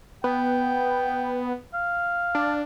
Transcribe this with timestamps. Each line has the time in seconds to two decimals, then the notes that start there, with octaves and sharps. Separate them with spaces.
0.24 B3 G5
1.74 F5
2.35 D4